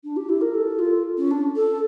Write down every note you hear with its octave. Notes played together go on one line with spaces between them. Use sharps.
D4
G4
E4
A#4
A4
F4
C#4
D4
A4